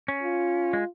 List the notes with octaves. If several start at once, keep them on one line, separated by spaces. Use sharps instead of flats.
C#4
F4
G#3